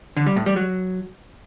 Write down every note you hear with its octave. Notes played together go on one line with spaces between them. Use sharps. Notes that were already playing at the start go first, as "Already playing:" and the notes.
D3
G3
A2
G3
F#3